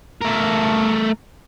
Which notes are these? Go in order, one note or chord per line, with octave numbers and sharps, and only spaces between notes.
A3 A#4